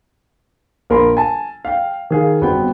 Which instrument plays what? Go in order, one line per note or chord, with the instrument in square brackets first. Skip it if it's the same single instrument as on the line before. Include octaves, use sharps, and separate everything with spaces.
[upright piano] A#1 A#4 B5 C6
G#5 A5
F5 G5
D#3 G#4 F5
G1 B3 C4 F#4 B4 G5